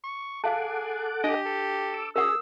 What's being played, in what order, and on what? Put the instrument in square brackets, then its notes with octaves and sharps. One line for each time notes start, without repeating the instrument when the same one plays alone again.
[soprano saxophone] C#6
[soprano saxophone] G#4 [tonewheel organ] A4 F#5 D6 [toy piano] F5 A5
[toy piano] D4 [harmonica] G4 [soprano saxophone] D#5
[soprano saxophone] A4
[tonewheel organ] D6 E6
[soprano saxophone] C#4 [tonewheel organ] G#4 [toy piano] A#4 F#5 D#6 [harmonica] E6